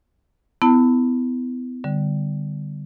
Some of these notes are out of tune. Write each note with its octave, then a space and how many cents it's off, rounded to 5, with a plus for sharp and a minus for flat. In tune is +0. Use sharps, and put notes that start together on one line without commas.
B3 +30 E4 +0 A5 +30
D3 +0 G3 +0